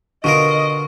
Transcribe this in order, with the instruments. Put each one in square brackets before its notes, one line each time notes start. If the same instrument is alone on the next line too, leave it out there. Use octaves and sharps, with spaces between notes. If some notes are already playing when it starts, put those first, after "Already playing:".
[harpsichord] B2 F4 A#4 [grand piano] D3 [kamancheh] D#5 [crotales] C#6